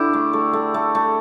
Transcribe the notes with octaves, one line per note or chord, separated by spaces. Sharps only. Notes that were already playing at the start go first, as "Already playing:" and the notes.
Already playing: D3 D4 E4 G4
A3
A3
A3
A3
A3